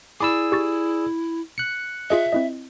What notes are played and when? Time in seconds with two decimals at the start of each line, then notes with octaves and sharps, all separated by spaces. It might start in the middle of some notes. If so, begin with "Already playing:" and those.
0.20 E4 G#4 D5 B5 D6 E6
0.52 G4 C#6 A6
1.58 F#6 C#7
2.10 F4 G#4 D#5 E5
2.32 C4 E4 D#5